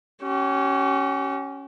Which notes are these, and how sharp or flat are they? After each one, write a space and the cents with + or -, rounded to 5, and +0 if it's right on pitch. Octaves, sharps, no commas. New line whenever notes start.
C#4 +0 G4 -40